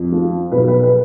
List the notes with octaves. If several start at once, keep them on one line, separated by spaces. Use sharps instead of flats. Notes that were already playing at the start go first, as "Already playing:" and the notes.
Already playing: F2
F3
B1 B4
B4
B4